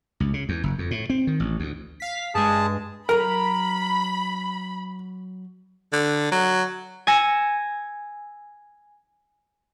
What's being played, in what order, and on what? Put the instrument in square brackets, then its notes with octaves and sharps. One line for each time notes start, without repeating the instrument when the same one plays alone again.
[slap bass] C#2
C#3
E2
F#1
F2
A2
C4
D#3
A1
D2
[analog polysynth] F5 B6
[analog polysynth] G2 G#3 [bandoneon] G#4 A5
[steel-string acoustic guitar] F#3 A#5 [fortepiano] A#4 [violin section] B5
[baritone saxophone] D3
F#3
[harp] G#5 E6 A#6 C#7